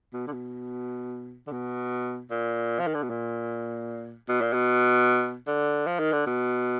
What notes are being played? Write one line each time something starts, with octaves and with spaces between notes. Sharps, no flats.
B2
D3
B2
D3
B2
A#2
F3
D#3
D3
B2
A#2
B2
A#2
B2
D3
F3
D#3
D3
B2